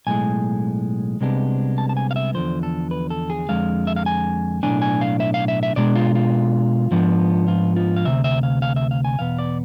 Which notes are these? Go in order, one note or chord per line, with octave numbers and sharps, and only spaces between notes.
B1 A2 G#3 G#5
C2 C3 G#3 B3 D4
A5
A5
G#5
F5
E5
E2 D3 F3 C5
A4
B4
A4
G#4
F2 D3 G#3 F5
E5
F5
G#5
B1 A2 G#3 D4 G#5
G#5
F5
E5
F5
E5
E5
B2 G#3 D4 D5
F4
F4
G#2 F3 B3 D4
F4
F4
F5
D2 C3 E5
E5
F5
F5
E5
F5
G#5
E2 B2 B3 F5
D5